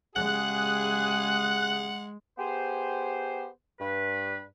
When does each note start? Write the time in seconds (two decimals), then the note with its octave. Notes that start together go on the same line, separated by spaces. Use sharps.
0.16 C#3 G#3 G4 G#4 F#5 F#6
2.37 B3 G4 G#4 C5
3.79 G2 B4